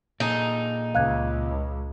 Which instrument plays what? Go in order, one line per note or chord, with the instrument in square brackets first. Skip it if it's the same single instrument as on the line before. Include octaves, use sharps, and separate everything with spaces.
[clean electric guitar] A#2 G#4 A4 [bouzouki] D#4
[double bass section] C#2 [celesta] F5 F#6 G#6